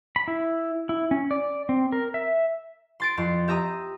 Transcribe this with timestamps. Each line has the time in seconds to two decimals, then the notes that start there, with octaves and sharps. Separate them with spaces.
0.16 B5
0.28 E4
0.89 E4
1.11 C#4
1.31 D5
1.69 C4
1.92 A#4
2.14 E5
3.00 C6 A6 D7
3.17 F2 C6
3.48 G4 E5 A#5 D#6